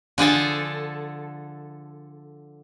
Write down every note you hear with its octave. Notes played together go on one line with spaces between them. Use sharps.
D3 F3 G#4 A4